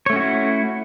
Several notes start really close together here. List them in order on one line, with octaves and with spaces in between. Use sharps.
C#5 A3 C#4 F#4 E4